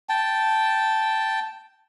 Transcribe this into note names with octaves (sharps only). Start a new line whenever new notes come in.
G5 A5